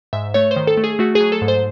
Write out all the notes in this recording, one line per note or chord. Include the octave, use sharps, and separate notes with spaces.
G#2 E5
A3 C#5
C5
D#3
A4
A3
G#4
A3 F#4
G#4
F#3
A4
G#2
C5